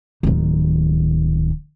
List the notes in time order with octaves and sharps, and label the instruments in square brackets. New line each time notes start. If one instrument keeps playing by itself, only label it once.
[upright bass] D1 D#3